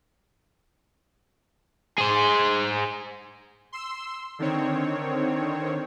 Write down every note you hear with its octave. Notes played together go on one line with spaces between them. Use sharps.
G#4 C5
C6 E6
D3 D#3 C4 C#5